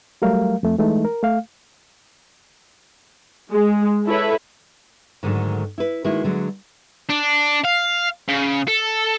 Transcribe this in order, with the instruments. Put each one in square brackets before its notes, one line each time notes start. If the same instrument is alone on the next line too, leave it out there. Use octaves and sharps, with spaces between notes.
[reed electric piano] F#3 G3 A3 A#4 F5
F2 A3
E3 G#3 A3 D#4
A#4
A3 F5
[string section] G#3
E4 A4 B4 C#5 E5
[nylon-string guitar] G#2 D3 D#3 F#3 A3
E4 B4
D#3 G#3 A#3 E4 F#4
D3 F#3 G#3 D4
[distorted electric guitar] D4
F5
C#3
A4